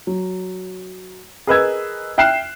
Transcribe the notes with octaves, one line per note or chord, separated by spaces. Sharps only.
F#3
G#4 A#4 B4 D#5 E6 G#6
E5 G5 F6 F#6 C7 E7